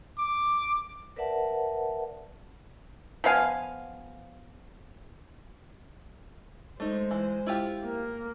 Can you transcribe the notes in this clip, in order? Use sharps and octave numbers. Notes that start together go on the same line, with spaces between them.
D6
A#4 B4 D5 E5 F#5 A5
F3 B3 F5 G#5
G#3 A3 D#4 C5
E3
E4 F4 G4
A#3